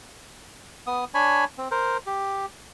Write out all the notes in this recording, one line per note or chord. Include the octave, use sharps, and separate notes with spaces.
B3 D#6
D4 C#5 G#5 B5
C4
A#4 C5
G4